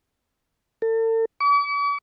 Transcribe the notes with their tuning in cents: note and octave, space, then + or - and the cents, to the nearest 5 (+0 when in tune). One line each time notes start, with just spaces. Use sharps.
A4 +40
D6 -45